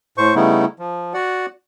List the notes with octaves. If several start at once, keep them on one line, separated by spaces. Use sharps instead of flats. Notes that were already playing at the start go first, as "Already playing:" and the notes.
A2 C5 C#6
C#3 G3 A3 B3 D#4 E4
F3
F#4 D5 F#5